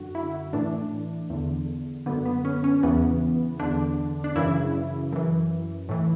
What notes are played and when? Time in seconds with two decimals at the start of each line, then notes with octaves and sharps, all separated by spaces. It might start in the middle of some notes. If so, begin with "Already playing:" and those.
Already playing: F#2 D3 F#4
0.15 E4
0.53 A2 E3 D4
1.30 E2 D3
2.06 F#2 D3 B3
2.25 B3
2.45 C#4
2.64 C#4
2.83 E2 C#3 E3 B3
3.59 E2 D3 D4
4.24 D4
4.36 F#2 C#3 E3 E4
5.12 F#2 E3
5.89 A2 E3